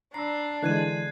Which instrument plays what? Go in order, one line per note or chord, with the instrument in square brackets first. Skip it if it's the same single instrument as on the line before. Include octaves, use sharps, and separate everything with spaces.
[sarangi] D4 [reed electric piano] A#5 B5 E6 [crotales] C7
[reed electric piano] D3 E3 G#3 [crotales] F#6 G#6 D#7